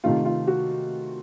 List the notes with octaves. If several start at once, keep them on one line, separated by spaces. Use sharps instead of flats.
C3 D#3 A3 F4
F4
F#4